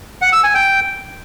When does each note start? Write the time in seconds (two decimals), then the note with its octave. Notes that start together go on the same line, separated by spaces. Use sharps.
0.22 F#5
0.33 E6
0.44 G#5
0.55 G5